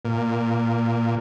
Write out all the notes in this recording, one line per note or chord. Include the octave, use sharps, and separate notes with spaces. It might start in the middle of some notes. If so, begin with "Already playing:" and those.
A#2